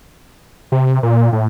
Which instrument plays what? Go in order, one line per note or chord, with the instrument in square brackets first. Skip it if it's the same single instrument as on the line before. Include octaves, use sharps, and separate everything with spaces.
[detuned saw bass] C3
A#2
A2